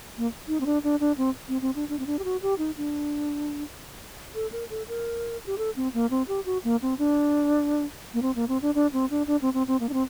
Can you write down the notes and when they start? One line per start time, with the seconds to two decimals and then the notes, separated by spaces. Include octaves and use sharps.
0.18 A#3
0.48 D#4
0.61 C4
0.66 D4
0.84 D4
1.00 D4
1.18 C4
1.48 C4
1.62 C4
1.76 D4
1.89 D4
1.99 C4
2.07 D4
2.19 G4
2.24 F#4
2.42 G4
2.58 D#4
2.77 D4
4.35 A4
4.52 A#4
4.70 A4
4.88 A#4
5.46 G4
5.58 A4
5.76 C4
5.94 A#3
6.10 C4
6.28 G4
6.46 F#4
6.64 A#3
6.82 C4
6.99 D4
8.14 A#3
8.22 C4
8.36 A#3
8.49 C4
8.62 D4
8.75 D4
8.93 C4
9.10 D4
9.27 D4
9.42 C4
9.54 C4
9.68 C4
9.80 A#3
9.89 D4
9.93 C4